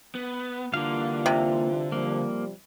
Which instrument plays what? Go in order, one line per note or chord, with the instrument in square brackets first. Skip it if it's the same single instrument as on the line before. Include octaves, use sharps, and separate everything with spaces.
[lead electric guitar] B3
[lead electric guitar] D3 [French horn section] E3 G3 F4 [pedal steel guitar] A#3 F5
[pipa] C3
[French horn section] F3 G3 [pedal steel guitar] A#3